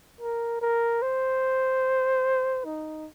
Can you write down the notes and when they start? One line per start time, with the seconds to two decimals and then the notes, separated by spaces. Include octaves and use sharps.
0.21 A#4
0.61 A#4
1.02 C5
2.65 D#4